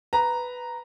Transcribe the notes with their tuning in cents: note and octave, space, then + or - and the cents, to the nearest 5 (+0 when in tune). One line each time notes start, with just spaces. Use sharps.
B4 +5 A#5 +0